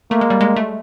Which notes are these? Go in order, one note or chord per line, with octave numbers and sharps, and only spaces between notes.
A3 A#3
G#3
G3
G#3
A3